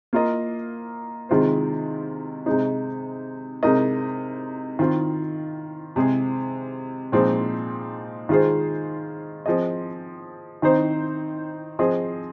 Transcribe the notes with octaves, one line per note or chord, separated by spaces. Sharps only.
A#3 F4 A#4 D#5
C3 D#3 G#3 F4 C5
C3 G#3 D#4
C3 G#3 D#4 A#4 D#5
D#3 C4 F4
C3 G#3 C4 G#4
A#2 F3 G#3 C4 D#4
D#3 G#3 F4 G#4 C5
F3 C4 G#4 D#5
D#3 C4 D#4 C5
F3 C4 G#4 D#5